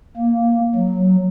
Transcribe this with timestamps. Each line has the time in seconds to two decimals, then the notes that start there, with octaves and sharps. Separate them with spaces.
0.16 A#3
0.75 F#3